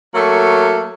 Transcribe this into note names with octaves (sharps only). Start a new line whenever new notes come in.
F#3 A3 A#3